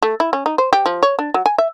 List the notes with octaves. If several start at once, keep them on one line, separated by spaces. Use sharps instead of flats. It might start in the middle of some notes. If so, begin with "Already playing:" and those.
A3
E4
C#4
D#4
C5
G4
F3
C#5
D4
F#3
G#5
E5